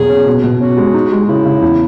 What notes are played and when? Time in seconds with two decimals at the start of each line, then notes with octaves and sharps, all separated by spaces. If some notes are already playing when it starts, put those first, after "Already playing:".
Already playing: E2 B2 F#3 G#4
0.09 C#4
0.26 B2
0.44 B2
0.61 C#4 F#4
0.77 G#3
0.94 D#4
1.12 G#3
1.28 C#3 E4
1.45 C#3
1.62 E2